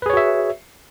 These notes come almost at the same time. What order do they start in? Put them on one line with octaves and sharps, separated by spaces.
B4 G#4 C#5 F#4 E5